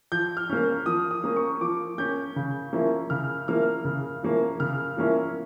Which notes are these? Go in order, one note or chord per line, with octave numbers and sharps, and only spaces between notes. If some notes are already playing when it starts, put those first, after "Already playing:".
F3 G6
F6
A#3 C#4
F3 D#6
D#6
A#3 C#4
C#6
F3 D6
A#3 C#4 G6
C#3
F3 A#3 C#4 E4
C#3 F6
F3 A#3 C#4 E4 F6
C#3
F3 A#3 C#4 E4
C#3 F6
F3 A#3 C#4 E4